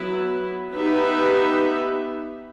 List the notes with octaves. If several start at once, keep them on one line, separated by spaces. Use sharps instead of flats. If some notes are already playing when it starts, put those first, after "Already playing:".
Already playing: F#3 B3 E4 B4
B3 D#4 G4 B4 E5